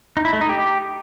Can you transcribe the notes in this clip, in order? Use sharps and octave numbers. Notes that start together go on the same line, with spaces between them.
D#4
E4
A3
D#4
G4